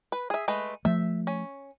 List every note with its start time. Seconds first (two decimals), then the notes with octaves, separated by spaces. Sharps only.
0.12 B4
0.30 G#4 E5
0.48 G#3 A3 B4
0.85 F3 A3 E5
1.27 C#4